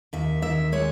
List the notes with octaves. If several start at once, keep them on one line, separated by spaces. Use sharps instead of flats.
D#2 E5
D#2 E5
G#3 C#5